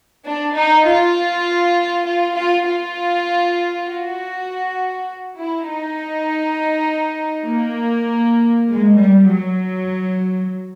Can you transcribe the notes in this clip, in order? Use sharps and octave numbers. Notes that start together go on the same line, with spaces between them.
D4
D#4
F4
F4
F4
F4
F#4
E4
D#4
A#3
G#3
G3
F#3